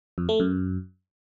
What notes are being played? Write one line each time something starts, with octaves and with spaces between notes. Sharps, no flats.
F2
A3
F#2